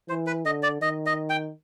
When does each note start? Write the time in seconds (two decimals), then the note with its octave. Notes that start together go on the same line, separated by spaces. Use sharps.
0.09 E3 C5
0.27 B4
0.45 D3 D#5
0.63 D5
0.81 D#3 D#5
1.06 D#5
1.30 G5